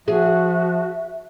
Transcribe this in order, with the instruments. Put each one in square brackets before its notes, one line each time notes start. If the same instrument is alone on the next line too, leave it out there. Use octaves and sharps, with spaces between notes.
[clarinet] F3 [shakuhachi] F#4 [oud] G#4 [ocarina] E5